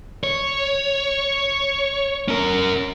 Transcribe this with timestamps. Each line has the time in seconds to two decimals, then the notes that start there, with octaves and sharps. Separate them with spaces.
0.24 C#5
2.28 C#4 A#4